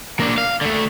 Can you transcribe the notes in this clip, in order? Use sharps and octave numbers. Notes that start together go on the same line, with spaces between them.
A#3 D4
F5
D3 A3